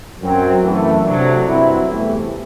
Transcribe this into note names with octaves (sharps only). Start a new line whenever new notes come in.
F#2 F#3 C4
F#2 E3 A3
C3 F#3 A3 D4
G2 F#3 C4 E4
E2 C3 E3 A3